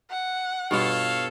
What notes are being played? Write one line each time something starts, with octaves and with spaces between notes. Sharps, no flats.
F#5
G2 B2 F4 A4 C#5 F5